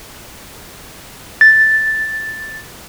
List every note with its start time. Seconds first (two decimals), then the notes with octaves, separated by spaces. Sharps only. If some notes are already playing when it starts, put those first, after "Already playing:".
1.41 A6